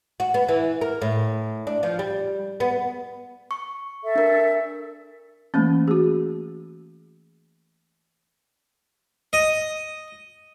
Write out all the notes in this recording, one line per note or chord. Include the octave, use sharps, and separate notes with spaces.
F#4
B3
E3
A#4
A2
D4
F3
G3
B3
C#6
A4 E5
D4 A#4
E3 A3 A#3 C#4
F#4 G#4
D#5